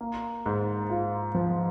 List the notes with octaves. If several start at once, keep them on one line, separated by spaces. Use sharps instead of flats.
A#3
G#2
F4
F3